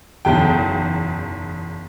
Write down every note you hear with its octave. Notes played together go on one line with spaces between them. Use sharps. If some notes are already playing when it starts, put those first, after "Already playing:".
F#1 B1 E2 G5